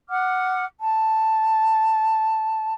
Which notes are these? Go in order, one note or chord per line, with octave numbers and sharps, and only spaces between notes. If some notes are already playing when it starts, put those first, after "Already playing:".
F#5 D6 F6
A5